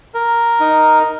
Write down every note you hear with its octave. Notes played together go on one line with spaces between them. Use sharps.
A#4
D#4